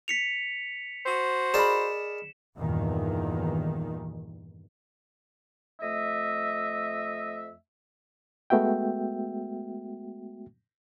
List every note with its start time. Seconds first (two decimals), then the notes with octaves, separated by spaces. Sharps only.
0.08 B6 C#7 F7
1.06 F#4 C5
1.54 G#4 A#4 D5 D#5 B5 E7
2.58 E2 G2 A#2 D#3
5.80 F2 A3 D#5 E5
8.50 G#3 A3 B3 F#4 E5 G5